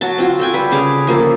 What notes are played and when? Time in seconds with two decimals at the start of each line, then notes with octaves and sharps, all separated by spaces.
0.01 F#3 F#4 A5
0.18 C4 F4 F#4
0.40 A4 G5 G#5
0.54 G3 B4
0.72 C#3 G#4 D6
1.07 F3 A#3 G4 A4